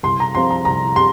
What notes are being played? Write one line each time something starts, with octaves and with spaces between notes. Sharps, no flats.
C2 C6
A#5
C3 F3 C4 C6
A#5
C2 A#5
C3 C6